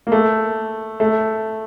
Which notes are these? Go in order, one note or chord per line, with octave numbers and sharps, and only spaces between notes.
A#3
A3
A3